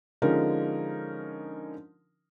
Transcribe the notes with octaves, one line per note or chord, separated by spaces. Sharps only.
D3 F3 G#3 C#4 D#4 A#4